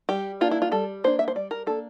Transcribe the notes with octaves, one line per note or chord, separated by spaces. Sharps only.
G3 G4
A#3 D4 F4
E4
F4
G3 A4
A#3 D4 C5
E5
C5
G3 D5
A#4
A#3 D4 A4